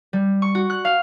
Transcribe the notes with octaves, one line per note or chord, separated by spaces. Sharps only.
G3
C#6
F#4
F#6
F5